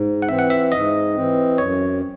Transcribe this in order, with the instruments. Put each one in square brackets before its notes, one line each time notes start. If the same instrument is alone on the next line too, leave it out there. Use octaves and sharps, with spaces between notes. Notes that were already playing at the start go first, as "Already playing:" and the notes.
Already playing: [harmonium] G#2
[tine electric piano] F#5
[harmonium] E3 C4 [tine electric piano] E5
[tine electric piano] F#5
E5
[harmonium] G#2 [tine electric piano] D#5
[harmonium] E3 C4
[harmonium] F#2 [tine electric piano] C#5